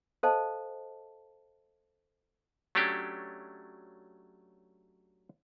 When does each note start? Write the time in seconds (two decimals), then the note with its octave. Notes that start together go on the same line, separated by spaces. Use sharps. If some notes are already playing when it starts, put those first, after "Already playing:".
0.23 A4 C5 D#5 F5 G#5 A5
2.75 F#3 A3 C#4 D4 G4